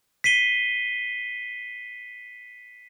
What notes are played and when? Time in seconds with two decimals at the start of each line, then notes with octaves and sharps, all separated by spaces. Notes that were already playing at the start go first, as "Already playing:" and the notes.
0.24 B6 C7 D#7 G7